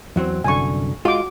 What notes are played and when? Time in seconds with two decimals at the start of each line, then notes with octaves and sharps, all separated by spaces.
0.16 E2 F#3 C4
0.44 C2 F#2 D3 G#5 C#6
1.05 G#3 F4 F#4 D6